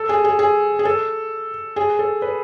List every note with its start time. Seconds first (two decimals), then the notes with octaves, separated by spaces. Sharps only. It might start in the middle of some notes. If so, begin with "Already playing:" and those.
Already playing: A4
0.09 G#4
0.24 G#4
0.39 G#4
0.79 G#4
0.85 A4
1.76 G#4
1.99 A4
2.22 B4